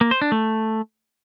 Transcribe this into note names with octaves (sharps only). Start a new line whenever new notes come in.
A#3
C5
D4
A3